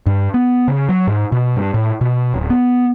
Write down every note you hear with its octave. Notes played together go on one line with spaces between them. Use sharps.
G2
B3
C#3
F#3
G#2
B2
G2
A2
B2
D1
B3